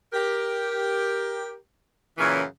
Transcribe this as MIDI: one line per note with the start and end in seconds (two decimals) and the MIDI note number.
0.13 1.54 67
0.13 1.54 70
2.18 2.43 42
2.18 2.43 46
2.18 2.43 49
2.18 2.43 52
2.18 2.43 61
2.18 2.43 64